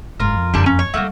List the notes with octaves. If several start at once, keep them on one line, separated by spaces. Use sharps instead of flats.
F#1 G#2 F4 A#4
F2
F#2 D3 G3 A#3 A5
C#4
C#5
G3 A3 A#3 E4 F#4